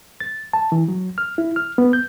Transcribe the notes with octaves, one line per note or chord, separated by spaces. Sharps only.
A6
A5
E3
F#3
F6
E4
F6
B3
G6